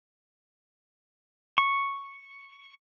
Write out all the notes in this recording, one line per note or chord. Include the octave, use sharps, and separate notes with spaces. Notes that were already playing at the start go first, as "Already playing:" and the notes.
C#6